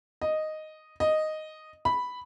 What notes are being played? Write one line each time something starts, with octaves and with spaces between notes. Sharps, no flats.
D#5
D#5
B5